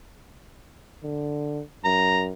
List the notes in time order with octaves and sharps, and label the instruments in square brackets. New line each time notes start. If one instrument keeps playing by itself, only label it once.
[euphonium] D3
[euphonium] F#2 [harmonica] A#5